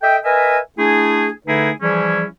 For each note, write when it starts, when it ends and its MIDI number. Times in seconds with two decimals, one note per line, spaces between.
0.02 0.18 69
0.02 0.18 75
0.02 0.18 76
0.02 0.18 79
0.24 0.59 70
0.24 0.59 71
0.24 0.59 75
0.24 0.59 76
0.24 0.59 80
0.78 1.30 57
0.78 1.30 62
0.78 1.30 64
0.78 1.30 68
1.47 1.71 50
1.47 1.71 57
1.47 1.71 63
1.47 1.71 64
1.47 1.71 68
1.47 1.71 71
1.81 2.25 52
1.81 2.25 53
1.81 2.25 55
1.81 2.25 61
1.81 2.25 64
1.81 2.25 68